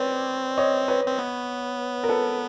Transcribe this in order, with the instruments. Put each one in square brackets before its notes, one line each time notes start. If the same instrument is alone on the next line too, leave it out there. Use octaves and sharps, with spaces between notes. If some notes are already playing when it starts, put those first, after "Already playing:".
Already playing: [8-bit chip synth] C4 [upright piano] B4 C#5 D5
[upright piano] C#5 D#5
B4 C#5
[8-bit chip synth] C4
B3
[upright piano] A#4
A4 B4